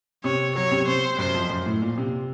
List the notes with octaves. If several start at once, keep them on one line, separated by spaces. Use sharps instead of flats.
C3 C#5
F#3 C#5
C3
C3 C5
F#2 C5
F2
F#2
A2
A#2
C3